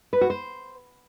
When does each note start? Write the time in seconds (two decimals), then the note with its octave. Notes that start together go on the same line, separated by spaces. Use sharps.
0.13 B4
0.21 F#4
0.30 C5